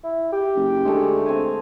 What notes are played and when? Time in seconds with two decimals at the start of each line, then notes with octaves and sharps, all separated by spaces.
0.04 E4
0.32 G4
0.56 F#1
0.85 D2 G#3 A3
1.26 C4 F5 G#5